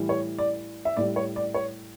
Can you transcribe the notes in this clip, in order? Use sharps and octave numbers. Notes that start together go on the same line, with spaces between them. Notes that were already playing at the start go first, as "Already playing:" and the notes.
Already playing: A2 E3 G3
C#5
D5
E5
A2 G3 D5
C#5
D5
C#5